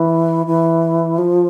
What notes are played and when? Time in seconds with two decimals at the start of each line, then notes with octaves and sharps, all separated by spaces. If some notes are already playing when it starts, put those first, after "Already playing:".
Already playing: E3
0.46 E3
1.18 F3